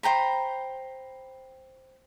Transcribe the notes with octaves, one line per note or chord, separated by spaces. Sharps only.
C5 G5 A#5 B5